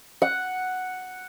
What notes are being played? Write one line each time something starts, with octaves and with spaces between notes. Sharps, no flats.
F#5